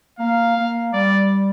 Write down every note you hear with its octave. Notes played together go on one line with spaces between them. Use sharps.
A#3 F5
A#3
G3 D5